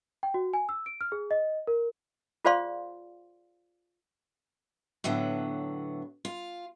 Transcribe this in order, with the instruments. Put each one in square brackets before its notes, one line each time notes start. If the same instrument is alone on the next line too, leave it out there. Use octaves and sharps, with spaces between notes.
[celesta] G5
F#4
G#5
E6
D7
F6
G#4
D#5
A#4
[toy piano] F4 G#4 C5 D5 F5 C6
[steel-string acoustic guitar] A2 D3 F#3 B3
F4